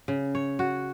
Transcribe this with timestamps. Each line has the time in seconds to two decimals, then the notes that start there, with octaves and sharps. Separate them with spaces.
0.08 C#3
0.35 C#5
0.59 F#4